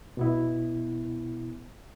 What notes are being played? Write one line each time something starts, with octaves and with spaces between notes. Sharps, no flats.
B2 B3 E4